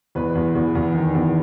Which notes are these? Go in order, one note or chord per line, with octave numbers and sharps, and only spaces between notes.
E2 B4
E2
E2
E2
D#3
E2